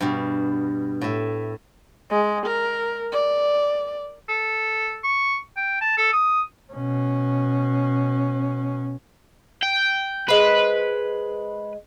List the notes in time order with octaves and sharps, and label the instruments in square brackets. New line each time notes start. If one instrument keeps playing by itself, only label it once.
[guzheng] G2 B2
A2 E5
[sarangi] G#3
A#4
D5
[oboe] A4
C#6
G5
A5
A4
D#6
[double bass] B2 C#4
[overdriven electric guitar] G5
[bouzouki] G#3 C5 [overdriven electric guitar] B4